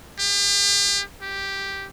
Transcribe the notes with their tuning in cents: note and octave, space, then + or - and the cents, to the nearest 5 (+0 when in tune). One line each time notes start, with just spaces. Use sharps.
G4 +40
G4 +0